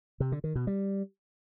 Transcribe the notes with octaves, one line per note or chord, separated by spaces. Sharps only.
C3
D3
D#3
B2
G3